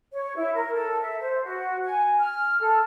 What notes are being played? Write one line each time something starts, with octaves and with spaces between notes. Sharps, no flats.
C#5
E4
A#4
A4
E5
C5
F#4
G#5
F6
A4